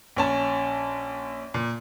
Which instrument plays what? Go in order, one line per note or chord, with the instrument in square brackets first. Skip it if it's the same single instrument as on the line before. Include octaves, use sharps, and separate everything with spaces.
[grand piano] A#1 C#4 A5
A#2